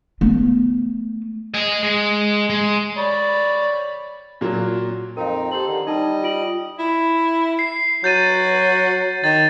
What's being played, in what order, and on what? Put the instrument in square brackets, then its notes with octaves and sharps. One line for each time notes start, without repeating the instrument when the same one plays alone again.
[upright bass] A3 B3
[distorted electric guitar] D#5 G#5
G#3
G#3
[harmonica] C#5 D5 B5
[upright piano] A#2 F#3
[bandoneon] F2 C4 D#4 [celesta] A#4 F5
[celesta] G4 F#7 [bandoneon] A4 C5
[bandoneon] D3 D#3
[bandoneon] G3 D#5 [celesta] D#4 A5
[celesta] F4 D7 F#7
[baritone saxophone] E4
[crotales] C7
[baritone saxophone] F#3 [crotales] G6 A6 D#7
[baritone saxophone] D#3 [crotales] A6